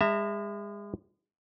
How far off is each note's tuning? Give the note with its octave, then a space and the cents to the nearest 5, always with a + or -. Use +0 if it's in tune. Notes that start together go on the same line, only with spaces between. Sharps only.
G#3 -35 E5 +0 A#5 -30